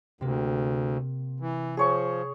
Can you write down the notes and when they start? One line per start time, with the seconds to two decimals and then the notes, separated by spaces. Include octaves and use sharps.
0.21 D2 C3 A#3
1.40 E3
1.77 F3 G#4 C#5 C#6